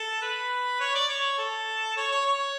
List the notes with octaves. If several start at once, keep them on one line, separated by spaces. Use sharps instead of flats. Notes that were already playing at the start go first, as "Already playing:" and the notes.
Already playing: A4
B4
C#5
D5
C#5
A4
C#5
C#5
C#5